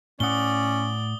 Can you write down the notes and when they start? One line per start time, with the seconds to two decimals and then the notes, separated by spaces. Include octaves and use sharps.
0.20 A2 C#4 D5 F#5 D#6 G7